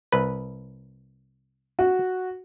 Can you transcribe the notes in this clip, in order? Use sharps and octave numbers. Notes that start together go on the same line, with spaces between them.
C2 B4
F#4